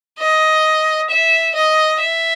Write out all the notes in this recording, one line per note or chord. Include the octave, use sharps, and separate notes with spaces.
D#5
E5
D#5
E5